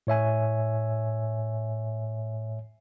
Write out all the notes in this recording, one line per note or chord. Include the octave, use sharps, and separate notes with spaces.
A2 C#5 E5 G#5